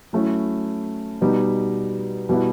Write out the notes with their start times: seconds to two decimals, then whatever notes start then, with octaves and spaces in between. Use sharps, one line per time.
0.13 F#3 A3 C#4 E4
1.21 B2 G3 B3 D#4
2.29 B2 G3 B3 E4